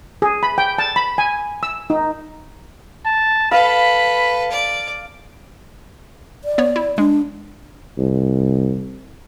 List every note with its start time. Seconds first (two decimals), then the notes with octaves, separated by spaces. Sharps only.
0.22 G#4
0.43 B5
0.58 G5
0.78 A5
0.96 B5
1.18 G#5
1.63 E6
1.90 D#4
3.05 A5
3.51 A4 B4 F5 B5
4.51 D5
6.44 D5
6.58 B3 C#5
6.76 E4
6.98 G#3 D4
7.98 C2